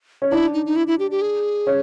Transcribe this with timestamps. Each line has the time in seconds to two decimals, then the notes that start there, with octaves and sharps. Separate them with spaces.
0.22 C#4
0.31 D4 E4
0.54 D#4
0.66 D#4
0.76 E4
0.87 E4
0.99 G4
1.11 G4
1.22 G#4
1.67 C#4